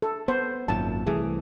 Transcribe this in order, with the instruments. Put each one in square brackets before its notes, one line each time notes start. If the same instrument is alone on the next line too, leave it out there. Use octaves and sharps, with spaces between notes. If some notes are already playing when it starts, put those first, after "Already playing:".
[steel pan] A4
[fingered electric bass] B3 [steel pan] C5
[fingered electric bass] G#1 F#2 A#2 [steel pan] A5
[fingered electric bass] C2 E3 A3 [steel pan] G#4